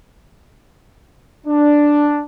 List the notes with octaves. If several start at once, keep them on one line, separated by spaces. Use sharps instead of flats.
D4